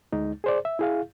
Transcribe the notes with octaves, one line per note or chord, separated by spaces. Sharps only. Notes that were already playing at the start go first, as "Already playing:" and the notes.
D2 G#3 D#4
G#4 C5 D5
E5
E4 G#4 F5